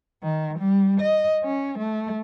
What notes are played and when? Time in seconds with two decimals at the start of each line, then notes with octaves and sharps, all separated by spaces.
0.23 D#3
0.60 G3
1.01 D#5
1.44 C#4
1.78 A3